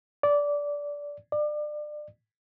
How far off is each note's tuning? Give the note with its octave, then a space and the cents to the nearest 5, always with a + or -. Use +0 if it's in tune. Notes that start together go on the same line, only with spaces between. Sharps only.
D5 -15
D5 +30